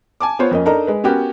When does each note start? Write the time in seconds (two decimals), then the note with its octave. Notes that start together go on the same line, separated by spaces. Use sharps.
0.20 G#5 A5 D6
0.39 B3 F4 C5 C#5
0.51 F2 A#3 C#4 D#5
0.65 D4 D#4 A4 A#4 D#5 A#5
0.87 G#3 B4
1.04 B3 C#4 F#4 G4 A#4